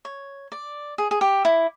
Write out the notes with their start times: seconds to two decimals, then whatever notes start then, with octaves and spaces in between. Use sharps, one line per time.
0.05 C#5
0.52 D5
0.98 G#4
1.11 G#4
1.21 G4
1.45 E4